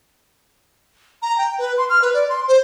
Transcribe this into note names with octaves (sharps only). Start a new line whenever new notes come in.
A#5
G5
B4
C6
F6
B4
D5
C6
C5